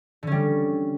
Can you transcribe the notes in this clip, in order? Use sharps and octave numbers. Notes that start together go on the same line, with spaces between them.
D3 G3 C#4